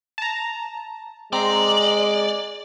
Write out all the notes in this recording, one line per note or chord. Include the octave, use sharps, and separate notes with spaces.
A5 A#5
G#3 C4 D5 A#5 C6